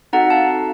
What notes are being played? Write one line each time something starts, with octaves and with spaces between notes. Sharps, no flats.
C4 D#4 F#4 A4 F#5 A#5
F5 A5